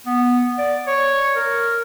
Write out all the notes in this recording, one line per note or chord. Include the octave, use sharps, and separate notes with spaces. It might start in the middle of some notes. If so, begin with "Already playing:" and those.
B3
D5
C#5
A#4